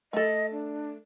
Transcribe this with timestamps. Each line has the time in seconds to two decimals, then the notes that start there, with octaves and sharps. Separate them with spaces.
0.13 A3 A4 D#5
0.52 D4